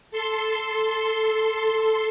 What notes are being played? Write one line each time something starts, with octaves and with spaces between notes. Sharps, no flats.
A4 C6